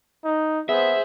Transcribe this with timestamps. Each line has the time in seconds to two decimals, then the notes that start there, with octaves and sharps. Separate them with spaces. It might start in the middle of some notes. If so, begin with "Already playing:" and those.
0.24 D#4
0.69 B3 G#4 C5 E5